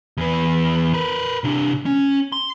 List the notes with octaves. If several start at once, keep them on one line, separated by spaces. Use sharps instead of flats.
E2 B4
A#4 B4
C3 D4
C#4
C6